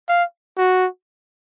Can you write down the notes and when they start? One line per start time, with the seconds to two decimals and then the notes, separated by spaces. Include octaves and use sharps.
0.09 F5
0.57 F#4